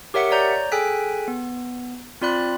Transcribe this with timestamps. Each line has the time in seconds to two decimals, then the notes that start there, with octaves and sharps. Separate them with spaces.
0.14 G4 A#4 C#5 E5 F#5 C#7
0.31 C#5 D5 A#5 G6
0.72 G#4 A4 G5 G#5 F#6 B6
1.28 B3
2.21 C4 F4 D5 B5 F#6